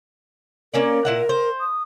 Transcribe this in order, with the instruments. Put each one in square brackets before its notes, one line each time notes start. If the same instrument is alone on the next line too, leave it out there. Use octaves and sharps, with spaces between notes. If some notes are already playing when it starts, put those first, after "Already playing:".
[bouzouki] A#3 C#4 D5 [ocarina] A#4
[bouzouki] A#2 E4 F#5
C5
[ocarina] D#6